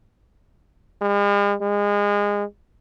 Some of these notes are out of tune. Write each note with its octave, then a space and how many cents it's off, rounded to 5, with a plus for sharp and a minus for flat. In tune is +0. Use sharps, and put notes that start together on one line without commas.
G#3 -45
G#3 -25